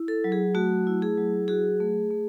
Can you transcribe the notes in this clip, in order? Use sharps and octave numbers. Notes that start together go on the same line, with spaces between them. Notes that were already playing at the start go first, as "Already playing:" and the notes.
Already playing: E4
A4
F#3
G#4
A3 F#4
E4
G#4
F#3
F#4 G#4
A3
A3